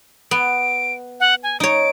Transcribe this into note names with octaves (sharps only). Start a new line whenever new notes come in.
B3 D7
F#5
G#5
D#4 C#5 D7